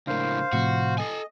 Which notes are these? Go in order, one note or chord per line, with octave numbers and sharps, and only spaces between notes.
C#2 A2 D4 A#4 C5 F5
A2 C3 F3 F#4
A4 D#5 G#5